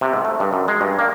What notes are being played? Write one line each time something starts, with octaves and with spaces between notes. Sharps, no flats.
C3
G#2
A3
G2
F#2
G#3
G2
A#3